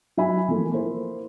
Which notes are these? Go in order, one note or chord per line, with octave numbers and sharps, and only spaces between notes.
F#3 F#4 E5 G#5 B5
E3 F3 A3 A#3
A#3 E4 C5